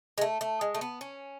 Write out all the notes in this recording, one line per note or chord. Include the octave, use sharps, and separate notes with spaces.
G#3
A3
A3
G#3
A3
B3
C#4